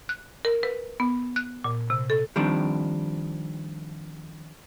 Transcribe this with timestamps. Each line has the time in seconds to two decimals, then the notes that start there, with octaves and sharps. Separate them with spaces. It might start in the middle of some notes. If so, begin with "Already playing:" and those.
0.09 F#6
0.45 A#4
0.63 B4
1.00 B3
1.36 F#6
1.64 A#2
1.90 C3
2.10 A4
2.36 D#3 F3 G3 C4 D4